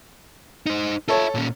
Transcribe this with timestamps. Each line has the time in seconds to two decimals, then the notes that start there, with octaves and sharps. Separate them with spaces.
0.66 D#4 C5
1.08 F4 A4 C#5 E5
1.35 A#2 C#4